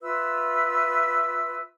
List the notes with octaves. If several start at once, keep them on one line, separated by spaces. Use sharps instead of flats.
F4 B4 E5 E6